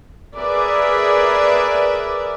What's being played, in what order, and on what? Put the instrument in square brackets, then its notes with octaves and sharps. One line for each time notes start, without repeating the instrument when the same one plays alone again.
[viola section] G#4 A#4 B4 D5 E5